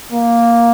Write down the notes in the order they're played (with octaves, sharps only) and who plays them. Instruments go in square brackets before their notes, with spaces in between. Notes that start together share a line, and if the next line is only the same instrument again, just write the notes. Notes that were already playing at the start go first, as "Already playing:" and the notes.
[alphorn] A#3